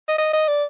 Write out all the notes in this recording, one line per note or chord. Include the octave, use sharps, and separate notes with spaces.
D#5
D#5
D#5
D5